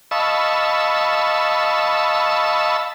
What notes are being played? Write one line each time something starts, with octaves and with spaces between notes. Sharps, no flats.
D#5 F5 A5 B5 C#6 E6